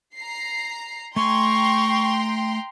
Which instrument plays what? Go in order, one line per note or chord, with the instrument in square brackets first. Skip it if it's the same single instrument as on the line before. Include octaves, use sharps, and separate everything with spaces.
[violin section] A#5 C7
[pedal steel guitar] A3 G#5 [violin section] G5 A#5 C6 [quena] C#6